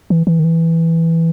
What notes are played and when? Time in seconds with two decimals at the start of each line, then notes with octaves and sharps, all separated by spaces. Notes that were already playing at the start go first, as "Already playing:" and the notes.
0.10 E3
0.27 E3
0.39 D#3
0.44 E3